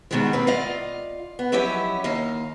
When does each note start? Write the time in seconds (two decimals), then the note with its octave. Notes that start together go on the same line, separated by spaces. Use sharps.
0.11 G#2 B2 D#3 E3 G3 G#3
0.33 G2 A#3 C4 B4
0.47 F4 D5 D#5 F5
1.39 B3
1.52 F3 F#3 C#4 E4 G4 D#5
2.04 D#2 D#5 F5